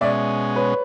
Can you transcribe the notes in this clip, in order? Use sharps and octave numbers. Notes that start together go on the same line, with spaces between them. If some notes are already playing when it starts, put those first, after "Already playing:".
B2 G#3 C#4 D5 E5
B4 C#5